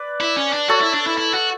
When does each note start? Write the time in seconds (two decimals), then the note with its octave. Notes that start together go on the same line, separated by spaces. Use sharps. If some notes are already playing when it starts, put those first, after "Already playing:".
Already playing: B4 D5
0.20 E4
0.37 C#4
0.53 D4
0.69 F#4 A4 C#5
0.81 E4
0.94 D4
1.06 E4
1.18 E4
1.34 F#4